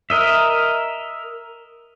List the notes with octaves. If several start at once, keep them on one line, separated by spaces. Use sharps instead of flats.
A#4 D#5 E5